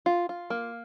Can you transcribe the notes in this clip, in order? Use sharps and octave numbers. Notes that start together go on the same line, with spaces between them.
F4
F4
A#3